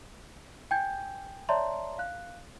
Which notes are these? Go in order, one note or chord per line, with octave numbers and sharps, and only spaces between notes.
G5 G#5 G6 G#6
C#5 D5 E5 A5 A#5 C6
F5 F#6